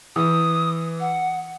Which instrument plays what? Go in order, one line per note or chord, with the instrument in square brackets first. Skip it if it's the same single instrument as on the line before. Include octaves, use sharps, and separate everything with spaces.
[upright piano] E3 [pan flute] D#6
[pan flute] F#5